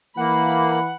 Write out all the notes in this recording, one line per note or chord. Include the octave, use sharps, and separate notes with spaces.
E3 A#3 F#5 B5